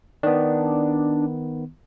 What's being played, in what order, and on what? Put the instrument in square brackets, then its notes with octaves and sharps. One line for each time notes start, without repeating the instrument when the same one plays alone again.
[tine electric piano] D#3 B3 [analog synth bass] D4